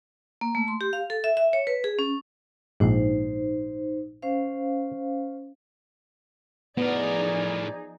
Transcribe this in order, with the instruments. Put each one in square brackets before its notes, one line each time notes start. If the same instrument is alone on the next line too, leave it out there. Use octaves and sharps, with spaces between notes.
[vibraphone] A#3
A3
C6
G4
F5
A4
E5
E5
C#5
B4
G#4
C#4
[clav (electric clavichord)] A#1 G#2 [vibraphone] D#4 C5
[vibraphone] C#4 C5 F5
[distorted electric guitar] A2 A#4 [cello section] F3 D#4 G#4 [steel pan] B3 [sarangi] D5